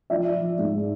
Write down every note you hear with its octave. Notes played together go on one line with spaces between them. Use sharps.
F3 D5 E5
F3
G#2